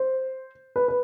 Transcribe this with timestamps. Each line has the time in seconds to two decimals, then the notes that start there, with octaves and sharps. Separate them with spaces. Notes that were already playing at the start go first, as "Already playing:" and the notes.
Already playing: C5
0.76 B4
0.88 B4